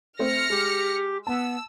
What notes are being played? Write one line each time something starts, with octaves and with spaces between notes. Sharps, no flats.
A3 C4 F6 A#6 C#7
G#3 G4
B3 A5 E6